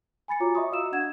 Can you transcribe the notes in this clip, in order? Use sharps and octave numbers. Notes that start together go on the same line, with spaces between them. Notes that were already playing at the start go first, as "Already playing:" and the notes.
G#5 B5 A6 C#7
F4 F#4 C#5 A#5 D6
D#5 E5 A#5 B5 C#6 D#6
F#4 D#5 F5 E6 E7
D4 F#5 G#6 E7